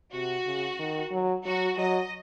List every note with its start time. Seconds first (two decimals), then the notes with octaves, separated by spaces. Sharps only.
0.14 C3 F#4
0.46 C#3
0.79 D#3
1.12 F#3
1.45 F#3 F#4
1.78 F#3 D#5